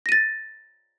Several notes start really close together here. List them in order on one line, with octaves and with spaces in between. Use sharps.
A#6 D#7 A6